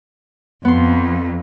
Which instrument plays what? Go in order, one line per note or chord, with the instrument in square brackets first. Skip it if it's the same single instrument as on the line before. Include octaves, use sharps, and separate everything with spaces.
[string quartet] F2 [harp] B3 C6